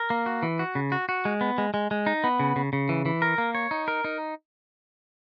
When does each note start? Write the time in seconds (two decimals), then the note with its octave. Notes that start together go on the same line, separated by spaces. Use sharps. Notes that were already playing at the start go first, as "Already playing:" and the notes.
Already playing: A#4
0.10 A#3
0.26 F#4
0.43 E3
0.59 F#4
0.75 C#3
0.92 F#4
1.09 F#4
1.25 G#3
1.41 B3
1.58 G#3
1.74 G#3
1.91 G#3
2.06 D#4
2.24 B3
2.39 C#3
2.56 C#3
2.73 C#3
2.89 E3
3.06 E3
3.22 A#4
3.38 A#3
3.55 C#5
3.71 D#4
3.88 A#4
4.05 D#4